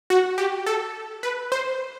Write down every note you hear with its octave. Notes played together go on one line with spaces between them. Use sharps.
F#4
G4
A4
B4
C5